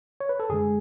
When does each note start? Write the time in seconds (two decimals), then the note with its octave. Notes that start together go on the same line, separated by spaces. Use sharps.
0.20 C#5
0.29 B4
0.40 A4
0.49 F#2 D3 G#3 G#4